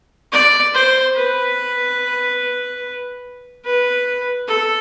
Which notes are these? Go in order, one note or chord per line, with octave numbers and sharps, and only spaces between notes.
D5
C5
B4
B4
A4